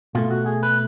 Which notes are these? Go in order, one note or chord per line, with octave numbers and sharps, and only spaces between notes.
B2 A3 F4
F#4
G#4
B4